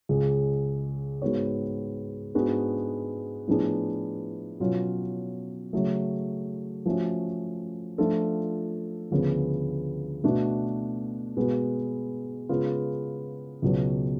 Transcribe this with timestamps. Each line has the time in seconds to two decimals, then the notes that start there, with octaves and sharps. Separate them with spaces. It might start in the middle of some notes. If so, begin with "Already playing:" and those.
0.09 C#2 C#3 G#3
1.22 G#2 G#3 B3 F#4 C#5
2.34 G#2 G#3 B3 D4 F#4
3.47 A2 F3 B3 D4 G#4
4.60 B2 F#3 C#4 F4
5.73 C#3 F#3 A3
6.86 F3 A3 C#4 F#4
7.98 F3 A3 D4 F4 A4
9.11 D2 C#3 F3 B3
10.24 B2 A3 D4 F#4
11.37 B2 G#3 B3 F#4 B4
12.49 C#3 G#3 B3 F4
13.62 C#2 B2 F#3